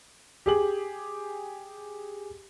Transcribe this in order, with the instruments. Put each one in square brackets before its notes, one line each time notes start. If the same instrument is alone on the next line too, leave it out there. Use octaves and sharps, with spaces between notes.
[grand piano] G4 G#4 F#7